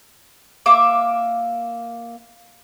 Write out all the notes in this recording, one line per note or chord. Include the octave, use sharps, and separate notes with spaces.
A#3 E5 D6